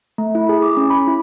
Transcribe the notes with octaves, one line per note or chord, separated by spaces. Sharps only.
A3
E4
G#4
D6
C#4
B5
E4